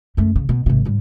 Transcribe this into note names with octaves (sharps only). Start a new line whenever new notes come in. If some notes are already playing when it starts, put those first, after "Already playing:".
F#2 A3
C#3
B2
G#1 C3
G#2 G3